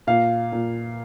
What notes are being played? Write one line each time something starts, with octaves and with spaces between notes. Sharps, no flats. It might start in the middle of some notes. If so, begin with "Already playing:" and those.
A#2 F5
A#2